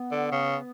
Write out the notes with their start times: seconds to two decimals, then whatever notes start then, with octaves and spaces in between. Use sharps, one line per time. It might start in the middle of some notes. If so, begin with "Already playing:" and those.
Already playing: B3
0.11 D3
0.32 C#3